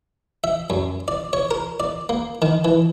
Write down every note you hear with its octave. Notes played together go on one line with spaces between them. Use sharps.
E5
F#2
D5
C#5
A#4
D5
A#3
D#3
E3